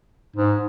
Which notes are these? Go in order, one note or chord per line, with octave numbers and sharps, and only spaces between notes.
G#2